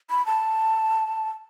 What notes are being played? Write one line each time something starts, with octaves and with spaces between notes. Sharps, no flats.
B5
A5